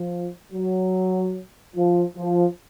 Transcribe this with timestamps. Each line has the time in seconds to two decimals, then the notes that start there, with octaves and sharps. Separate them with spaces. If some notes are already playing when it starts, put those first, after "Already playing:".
Already playing: F3
0.52 F#3
1.75 F3
2.17 F3